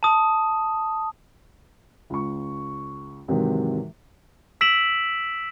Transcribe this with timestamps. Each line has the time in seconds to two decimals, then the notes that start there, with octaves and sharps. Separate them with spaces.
0.03 A5 D#6
2.10 C#2 C#6
3.28 G#2 C3 D#3 E3 F#3 G4
4.61 E6 B6 D7 E7 F#7